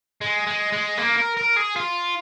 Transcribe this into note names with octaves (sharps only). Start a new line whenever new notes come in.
G#3
G#3
G#3
A#3
A#4
A#4
G#4
F4